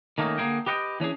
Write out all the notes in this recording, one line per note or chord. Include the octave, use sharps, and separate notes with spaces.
D#3 A3 A#3 C#4 D#4
D3 A#3 E4 G#4 G5
G4 B4 D#5 F#5 G5
E3 C#4 D4 G#4